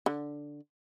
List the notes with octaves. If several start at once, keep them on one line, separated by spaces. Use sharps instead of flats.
D3